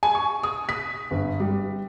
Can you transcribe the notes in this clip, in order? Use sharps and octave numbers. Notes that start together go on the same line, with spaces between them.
G#5
C#6
D#6
B6
G1
G3